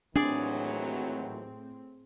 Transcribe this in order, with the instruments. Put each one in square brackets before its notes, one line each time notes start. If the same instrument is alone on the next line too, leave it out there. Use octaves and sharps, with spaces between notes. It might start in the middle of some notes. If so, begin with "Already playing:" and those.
[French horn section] D#2 E3 F#3 [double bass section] A2 C4 [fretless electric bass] D4 [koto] G#4 D5